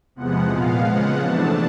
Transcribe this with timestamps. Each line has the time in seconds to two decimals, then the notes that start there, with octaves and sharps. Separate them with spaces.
0.15 E2 C3 F3 G#3 B3 F#5
0.50 A#2 F3 G#3 B3 F5
0.85 C#3 F3 G#3 B3 F#5
1.19 C3 E3 A3 D4 A5